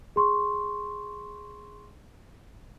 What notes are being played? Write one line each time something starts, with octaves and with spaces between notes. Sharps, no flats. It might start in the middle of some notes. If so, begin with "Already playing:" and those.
G#4 C6 C#6